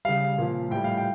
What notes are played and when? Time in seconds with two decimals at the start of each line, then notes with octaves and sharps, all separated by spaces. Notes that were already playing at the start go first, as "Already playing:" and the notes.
0.05 C#3 G3 F5
0.38 A#2 F3
0.71 A2 G3 G5
0.84 F5
0.97 G5